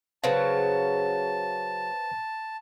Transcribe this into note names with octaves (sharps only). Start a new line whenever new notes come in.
C#3 F#3 B4 C5 F5 A5